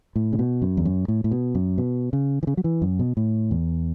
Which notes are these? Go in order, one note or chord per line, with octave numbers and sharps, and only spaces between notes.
A2
C#3
B2
F#2
E2
F#2
A2
A2
B2
F#2
B2
C#3
E3
C#3
F#3
E3
F#2
B2
A2
E2